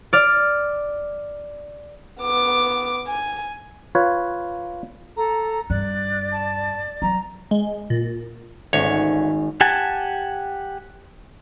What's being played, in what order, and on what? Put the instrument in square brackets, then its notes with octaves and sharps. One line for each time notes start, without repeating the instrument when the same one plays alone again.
[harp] D5 F6
[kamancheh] B3 D6
G#5
[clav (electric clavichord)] F4 B4 C#5
[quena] A4 [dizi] A#5
[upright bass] G2 [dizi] D5 [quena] F#6
[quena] A5
[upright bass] F#3 [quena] A#5
[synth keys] G#3
A#2
[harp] G#1 C#4 [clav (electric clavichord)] D2 C#5
[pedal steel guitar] G4 F#5 G#5 A5